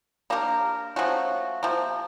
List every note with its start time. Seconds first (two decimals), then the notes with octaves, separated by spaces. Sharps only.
0.30 A#3 D4 G4 A#4
0.96 F3 A3 C#4 F#4
1.63 C3 F3 A#3